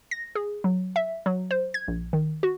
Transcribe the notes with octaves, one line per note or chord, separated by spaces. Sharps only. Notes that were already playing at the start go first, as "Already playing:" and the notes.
A#6
G#4
F#3
E5
F#3
C5
G#6
A#1
D#3
F#4